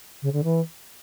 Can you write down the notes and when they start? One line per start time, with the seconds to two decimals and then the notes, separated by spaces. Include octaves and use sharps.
0.22 C#3
0.33 D3
0.43 E3